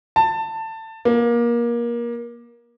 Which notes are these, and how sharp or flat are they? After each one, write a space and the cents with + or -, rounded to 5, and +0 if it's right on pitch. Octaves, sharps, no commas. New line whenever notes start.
A5 +20
A#3 +25